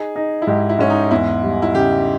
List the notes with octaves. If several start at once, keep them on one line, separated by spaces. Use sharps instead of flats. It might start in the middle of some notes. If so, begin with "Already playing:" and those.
Already playing: D#4 G#4
D#4
E4
G#2 G4
E4
G#2 C#4
D#4
E2 E4
G3
E4
C#3 G4